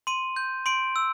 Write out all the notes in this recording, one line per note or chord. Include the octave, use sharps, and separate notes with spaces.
C6 D#7
G6
C6 D7
E6